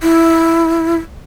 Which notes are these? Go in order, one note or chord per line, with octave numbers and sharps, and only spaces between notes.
E4